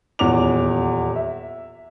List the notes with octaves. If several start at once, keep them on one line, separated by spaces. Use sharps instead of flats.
D#1 E2 C#5 F#5 D6 F7
E5